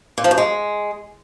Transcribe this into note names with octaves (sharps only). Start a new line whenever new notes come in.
A#2
F3
F#2
G#3